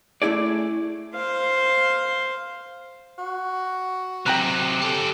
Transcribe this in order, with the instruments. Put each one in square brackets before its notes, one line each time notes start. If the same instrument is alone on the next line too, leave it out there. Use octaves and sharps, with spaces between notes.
[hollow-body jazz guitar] A3 C#4 E4 G#4 D5
[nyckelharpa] C5 F5
[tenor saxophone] F#4
[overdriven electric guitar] C3 F#3 [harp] G5 A#5 F#6
[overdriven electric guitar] G4 A4